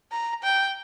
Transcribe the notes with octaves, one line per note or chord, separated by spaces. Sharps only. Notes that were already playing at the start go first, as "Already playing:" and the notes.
A#5
G5